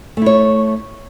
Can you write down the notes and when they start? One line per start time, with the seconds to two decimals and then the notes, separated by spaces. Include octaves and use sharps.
0.17 A3
0.22 E4
0.26 C#5